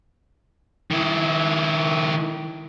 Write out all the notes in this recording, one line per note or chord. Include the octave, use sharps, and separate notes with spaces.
D#3 E4